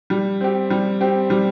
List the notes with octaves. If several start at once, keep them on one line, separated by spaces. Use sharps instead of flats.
G3
C4 G4
G3
C4 G4
G3